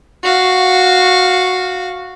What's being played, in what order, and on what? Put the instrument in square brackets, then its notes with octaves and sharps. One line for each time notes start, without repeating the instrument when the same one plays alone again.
[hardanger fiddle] F#4 F5